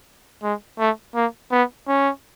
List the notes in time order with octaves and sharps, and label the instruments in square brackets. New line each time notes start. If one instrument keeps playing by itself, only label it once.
[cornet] G#3
A3
A#3
B3
C#4